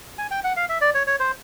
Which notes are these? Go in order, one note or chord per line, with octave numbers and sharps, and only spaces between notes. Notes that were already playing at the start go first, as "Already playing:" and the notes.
G#5
G5
F#5
F5
E5
D5
C#5
C#5
C5